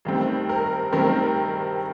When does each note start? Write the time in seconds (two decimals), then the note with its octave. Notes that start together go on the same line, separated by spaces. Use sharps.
0.05 G2 D#3 A3 C4
0.49 A#4
0.92 G2 D#3 A3 C4 A#4